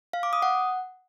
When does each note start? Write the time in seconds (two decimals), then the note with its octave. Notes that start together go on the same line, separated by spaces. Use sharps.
0.13 F5
0.23 D6
0.33 D#6
0.42 F#5